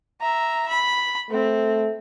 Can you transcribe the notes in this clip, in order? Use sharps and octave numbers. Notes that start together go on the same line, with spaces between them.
E5 A#5
B5
A3 C4